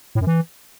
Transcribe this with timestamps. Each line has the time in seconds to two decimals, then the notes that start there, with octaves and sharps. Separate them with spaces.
0.15 A2
0.21 F#2
0.27 E3